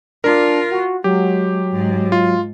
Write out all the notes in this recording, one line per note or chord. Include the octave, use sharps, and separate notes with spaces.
D4 F4 A#4
F#4
F#3 G#3 G4
G#2
F4